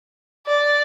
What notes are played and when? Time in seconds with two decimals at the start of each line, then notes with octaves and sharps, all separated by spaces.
0.47 D5